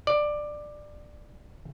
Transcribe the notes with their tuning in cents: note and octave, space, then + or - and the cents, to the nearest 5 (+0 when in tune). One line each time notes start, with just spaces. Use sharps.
D5 +15